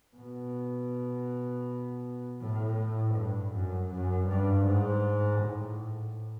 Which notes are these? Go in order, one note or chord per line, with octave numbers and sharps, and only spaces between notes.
B2
A2
G2
F#2
F#2
G2
G#2
A2